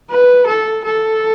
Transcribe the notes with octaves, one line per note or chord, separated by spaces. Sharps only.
B4
A4
A4